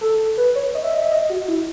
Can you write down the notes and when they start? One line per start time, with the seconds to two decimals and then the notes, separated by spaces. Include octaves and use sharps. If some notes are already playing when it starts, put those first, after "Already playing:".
0.01 A4
0.37 B4
0.55 C#5
0.75 D#5
0.84 E5
0.93 D#5
1.02 E5
1.11 D#5
1.30 F#4
1.48 E4